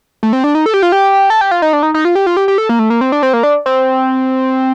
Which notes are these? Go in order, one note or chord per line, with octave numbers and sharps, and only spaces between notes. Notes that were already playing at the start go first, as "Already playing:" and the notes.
A3
C4
D4
D#4
A4
G4
F4
G4
A4
G4
F4
D#4
D4
D#4
D#4
F4
G4
F4
G4
G4
A4
A#3
A3
A#3
C4
D4
C4
A#3
D4
C4